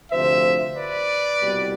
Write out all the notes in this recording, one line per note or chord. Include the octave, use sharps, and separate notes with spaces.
D2 C3 F3 C5 E5
B4 D5
C2 B2 G3